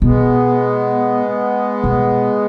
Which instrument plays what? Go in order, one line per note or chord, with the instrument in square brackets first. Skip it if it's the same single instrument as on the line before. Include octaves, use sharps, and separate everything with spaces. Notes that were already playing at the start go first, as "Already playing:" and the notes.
[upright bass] B2 [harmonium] G#3 B3
[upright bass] B2